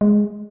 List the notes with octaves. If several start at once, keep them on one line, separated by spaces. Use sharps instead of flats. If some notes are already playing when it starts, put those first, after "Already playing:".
G#3